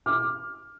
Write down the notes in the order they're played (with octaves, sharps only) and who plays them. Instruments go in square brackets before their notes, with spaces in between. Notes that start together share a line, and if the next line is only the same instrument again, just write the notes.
[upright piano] D6 F6